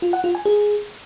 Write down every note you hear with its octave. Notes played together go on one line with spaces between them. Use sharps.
F4
F#5
F4
G#5
G#4